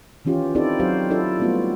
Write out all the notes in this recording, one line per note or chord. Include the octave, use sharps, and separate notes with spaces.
D#3 E3 C#4 F4 G4
C4 D#4 E4 G4 A4 D5
F#3 C4 F#4 G4 C5 F5
D4 E4 F4 A4 D5
G3 A3 B3 F4 F#4